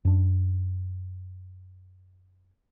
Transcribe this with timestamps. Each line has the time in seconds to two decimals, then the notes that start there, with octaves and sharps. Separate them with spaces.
0.05 F#2 D4